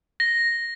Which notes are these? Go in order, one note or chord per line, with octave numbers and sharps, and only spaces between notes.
A#6